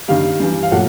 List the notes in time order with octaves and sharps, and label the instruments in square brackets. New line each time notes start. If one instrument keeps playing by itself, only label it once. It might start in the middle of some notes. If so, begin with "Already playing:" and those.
[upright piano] G2 D#3 G3 F5
G2 E3 G3
F5
A#2 F#3 A3 F#5